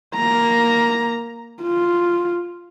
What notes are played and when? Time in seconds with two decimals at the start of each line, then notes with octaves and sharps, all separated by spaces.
0.15 A#3 A#5
1.63 F4